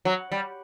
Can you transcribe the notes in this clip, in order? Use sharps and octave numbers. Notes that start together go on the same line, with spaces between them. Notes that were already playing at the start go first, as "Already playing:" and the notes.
F#3
G3